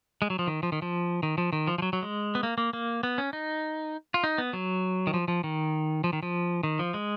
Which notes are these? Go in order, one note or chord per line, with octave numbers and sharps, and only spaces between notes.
G#3
F#3
F3
D#3
F3
D#3
F3
D#3
F3
D#3
F3
F3
F#3
F#3
G#3
B3
A#3
A#3
A#3
B3
C#4
D#4
F4
D#4
B3
F#3
D#3
F3
F3
D#3
F3
D#3
F3
D#3
F3
G#3